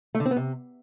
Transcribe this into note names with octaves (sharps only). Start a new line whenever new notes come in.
A3
D3
C4
B3
C3